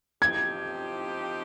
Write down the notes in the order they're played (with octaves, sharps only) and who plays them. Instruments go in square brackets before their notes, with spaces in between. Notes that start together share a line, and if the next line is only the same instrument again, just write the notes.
[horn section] F3 C4 D#4 G4 [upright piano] G#6